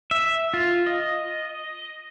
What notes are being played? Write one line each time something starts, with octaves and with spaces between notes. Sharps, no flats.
E5
F4
D#5